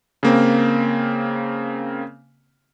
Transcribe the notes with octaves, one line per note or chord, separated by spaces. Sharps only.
C#3 A#3 C4